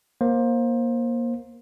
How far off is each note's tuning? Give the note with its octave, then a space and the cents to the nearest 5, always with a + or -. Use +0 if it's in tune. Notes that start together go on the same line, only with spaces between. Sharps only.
A#3 +20 C5 +20